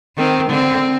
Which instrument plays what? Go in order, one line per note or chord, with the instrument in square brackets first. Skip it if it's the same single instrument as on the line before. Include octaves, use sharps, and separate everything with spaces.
[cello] D#3 [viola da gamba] C4
[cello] D3 [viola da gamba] C4